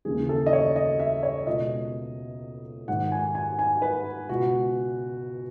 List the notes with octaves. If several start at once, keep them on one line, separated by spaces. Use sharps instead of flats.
D#2 C#3 E3 G#4
A4
D#5
C#5
D#5
E5
C#5
C#2 B2 D#5
G#2 D#3 F#5
G#5
G#5
G#5
B4
C#2 B2 F#4